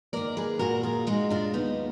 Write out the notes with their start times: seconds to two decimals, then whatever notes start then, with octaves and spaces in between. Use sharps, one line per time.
0.13 D#3 A#3 A#4 D5
0.37 G#4 B4
0.59 A#2 F#4 A#4
0.83 F4 G#4
1.07 G#3 D#4 F#4
1.30 D4 F4
1.54 D#2 B3 D#4